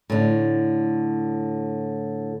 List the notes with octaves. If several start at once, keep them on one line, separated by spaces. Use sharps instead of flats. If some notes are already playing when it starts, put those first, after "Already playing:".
A2 D3